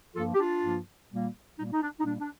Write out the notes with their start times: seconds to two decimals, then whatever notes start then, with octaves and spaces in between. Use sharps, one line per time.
0.15 G2 F3 A#3 F4 A4
0.34 G4
0.39 D4 F4
0.63 G2 F3 A#3
1.11 A#2 G3 A#3
1.58 A#2 G3 A#3 D#4
1.72 D#4
1.82 D4
2.00 D#4
2.05 A#2 G3 A#3 D4
2.20 D4